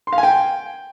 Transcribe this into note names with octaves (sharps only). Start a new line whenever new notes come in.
C6
F5
G#5
G5